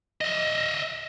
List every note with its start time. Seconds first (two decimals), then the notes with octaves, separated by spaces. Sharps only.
0.21 D#5 E5